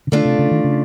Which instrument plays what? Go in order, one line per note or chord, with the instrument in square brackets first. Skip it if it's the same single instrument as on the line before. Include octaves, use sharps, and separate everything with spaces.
[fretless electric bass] C#3
[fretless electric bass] D3 [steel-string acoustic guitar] A3 D4 F4
[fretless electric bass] C3
C#3
D#3
C#3